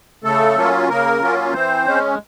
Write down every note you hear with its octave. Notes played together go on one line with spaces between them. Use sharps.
C#3 A3 A4
F#3 A#3 C#4 F4
C#3 A#3 A#4
F#3 A#3 C#4 F4
E3 C4 C5
G#3 C#4